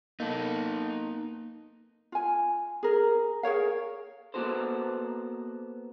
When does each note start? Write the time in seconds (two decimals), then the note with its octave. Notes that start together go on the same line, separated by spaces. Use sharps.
0.20 A#3 B3 D#4 A4
2.12 F4 G#5
2.83 G#4 A#4
3.43 G#4 A#4 C#5 F5
4.34 A#3 B3 F#4 A4 C5